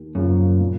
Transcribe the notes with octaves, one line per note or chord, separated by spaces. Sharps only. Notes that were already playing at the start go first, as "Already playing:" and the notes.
Already playing: D#2
F#2 C#3 F3 A#3
A#2